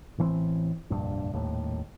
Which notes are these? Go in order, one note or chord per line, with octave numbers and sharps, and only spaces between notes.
A1 E3 A#3 C4
F1 A#1 G2
D#1 D#2 A2